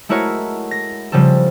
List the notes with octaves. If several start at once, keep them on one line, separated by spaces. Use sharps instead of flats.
G#3 A3 E4 F#4 A#4 C#5
A#6
C#3 F3 G3 C4 A4